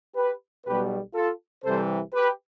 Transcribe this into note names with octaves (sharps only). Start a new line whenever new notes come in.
G4 B4
B1 B2 G3 G4 B4
F4 A4
C2 C3 E3 G3 A4 C5
G4 B4